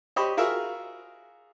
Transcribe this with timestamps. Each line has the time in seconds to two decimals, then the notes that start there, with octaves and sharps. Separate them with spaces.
0.16 G4 C5 D#5 B5 C#6
0.37 F4 F#4 G#4 A#4 E5 F5